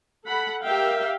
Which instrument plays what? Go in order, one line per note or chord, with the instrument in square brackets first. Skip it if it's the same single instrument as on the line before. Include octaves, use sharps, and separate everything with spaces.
[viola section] A4 F#5 B5
G4 A#4 E5 F5 G5